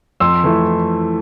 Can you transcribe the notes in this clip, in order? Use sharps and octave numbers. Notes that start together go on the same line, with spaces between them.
F2 C6 E6
E3 A3 E4